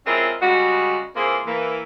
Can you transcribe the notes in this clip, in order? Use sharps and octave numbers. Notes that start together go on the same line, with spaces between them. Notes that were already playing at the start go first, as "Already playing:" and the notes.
G#3 C4 C#4 E4 F4 A#4
C#3 G3 G#3 F#4
E3 A#3 C4 F4 G#4
E3 A#3